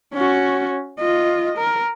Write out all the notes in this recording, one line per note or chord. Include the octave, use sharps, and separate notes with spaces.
C#4 F#4
F4 D#5
A#4